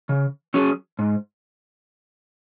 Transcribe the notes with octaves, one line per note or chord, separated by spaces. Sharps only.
C#3
F#3 C#4 G#4
G#2